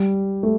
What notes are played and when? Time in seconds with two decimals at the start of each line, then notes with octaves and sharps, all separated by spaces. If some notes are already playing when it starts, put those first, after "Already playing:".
Already playing: G3
0.43 A3